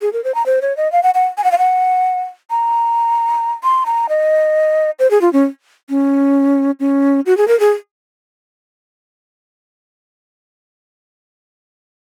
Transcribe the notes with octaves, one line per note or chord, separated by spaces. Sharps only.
G#4
A#4
C5
A#5
C5
C#5
D#5
F5
F#5
F#5
G#5
F#5
F5
F#5
A#5
C6
A#5
D#5
C5
G#4
F4
C#4
C#4
C#4
F#4
G#4
A#4
G#4